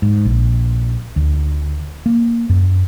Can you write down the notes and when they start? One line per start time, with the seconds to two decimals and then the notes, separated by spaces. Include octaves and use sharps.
0.02 G#2
0.25 A#1
1.16 D2
2.06 A#3
2.49 F#2